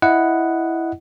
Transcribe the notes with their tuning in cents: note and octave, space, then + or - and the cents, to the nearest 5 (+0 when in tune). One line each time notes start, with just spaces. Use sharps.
E4 +0 D#5 +0 F#5 +0